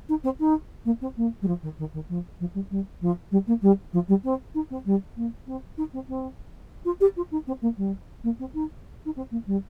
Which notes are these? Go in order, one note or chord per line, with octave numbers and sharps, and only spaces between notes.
D#4
C4
D#4
A#3
C4
A#3
G3
F3
D#3
D#3
D#3
F3
F3
G3
G3
F3
G3
A#3
G3
F3
G3
C4
D#4
C4
G3
A#3
C4
D#4
C4
C4
F4
G4
F4
D#4
C4
A#3
G3
A#3
C4
D#4
D#4
C4
A#3
G3